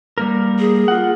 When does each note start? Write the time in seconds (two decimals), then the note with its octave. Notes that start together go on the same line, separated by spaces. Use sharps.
0.18 G3 A#3 A#4
0.59 G#4
0.88 F4 F#5